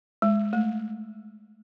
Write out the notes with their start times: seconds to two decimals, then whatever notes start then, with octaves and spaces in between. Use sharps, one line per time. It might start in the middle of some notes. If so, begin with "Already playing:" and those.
0.22 G#3
0.53 A3